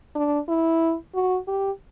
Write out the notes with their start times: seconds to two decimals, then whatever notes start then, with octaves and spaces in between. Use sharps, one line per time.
0.15 D4
0.48 E4
1.15 F#4
1.48 G4